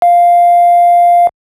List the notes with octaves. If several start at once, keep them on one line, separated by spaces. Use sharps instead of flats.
F5